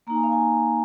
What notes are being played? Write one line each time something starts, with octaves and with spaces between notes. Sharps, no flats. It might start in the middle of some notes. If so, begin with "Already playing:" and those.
A#3 D#4 A#5
G#5
F5
G#5